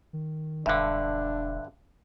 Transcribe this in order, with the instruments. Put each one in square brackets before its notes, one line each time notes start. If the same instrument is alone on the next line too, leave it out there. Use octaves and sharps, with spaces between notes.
[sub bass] D#3
[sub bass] E1 [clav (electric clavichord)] G2 D3 [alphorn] D4 [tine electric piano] E5 F#6